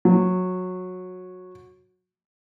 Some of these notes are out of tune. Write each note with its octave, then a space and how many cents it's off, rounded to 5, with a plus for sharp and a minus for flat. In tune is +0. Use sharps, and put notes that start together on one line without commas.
F#3 -15